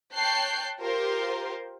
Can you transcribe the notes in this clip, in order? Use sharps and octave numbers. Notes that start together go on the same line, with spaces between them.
C#5 G5 A5 F#6 G6 C7
F4 G4 A#4 C5